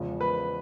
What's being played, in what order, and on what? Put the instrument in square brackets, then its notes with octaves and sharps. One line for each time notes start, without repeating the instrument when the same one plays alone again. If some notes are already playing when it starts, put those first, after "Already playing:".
Already playing: [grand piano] E2 C#3 F3 G#3
B4